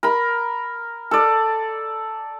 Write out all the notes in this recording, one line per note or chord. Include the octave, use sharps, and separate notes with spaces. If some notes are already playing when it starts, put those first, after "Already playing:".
A#4 B5
A4 D5